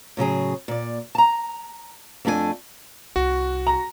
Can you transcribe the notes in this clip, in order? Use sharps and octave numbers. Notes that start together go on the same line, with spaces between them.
A2 C#3 F#3 G#4
A#2 D5
A5 A#5
F2 A3 D4 G#4 G#5
C2 F#4
A#5